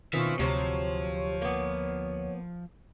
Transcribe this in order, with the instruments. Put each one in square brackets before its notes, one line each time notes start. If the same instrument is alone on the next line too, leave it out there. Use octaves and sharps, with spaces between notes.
[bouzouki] B2 C4 C#4 [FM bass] D#3 [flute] F4 [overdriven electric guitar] B4 E5
[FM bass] D2 [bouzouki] C3 F#3 C5 [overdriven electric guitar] F3 [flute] C#5
[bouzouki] A#3 B3